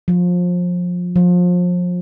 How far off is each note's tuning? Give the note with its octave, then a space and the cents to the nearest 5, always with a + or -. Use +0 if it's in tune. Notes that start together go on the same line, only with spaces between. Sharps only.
F3 +25
F3 +30